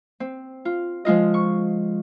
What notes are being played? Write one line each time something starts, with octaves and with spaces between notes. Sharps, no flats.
C4
F4
F3 G#3 F4 D#5
C#6